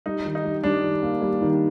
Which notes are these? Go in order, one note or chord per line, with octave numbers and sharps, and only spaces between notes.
G3 D#4
D#3
D#4
G3
G3 D4
D#3
A#3
G3
D#3